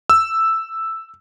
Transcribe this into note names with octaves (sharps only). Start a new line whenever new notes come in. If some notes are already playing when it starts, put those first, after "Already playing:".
E6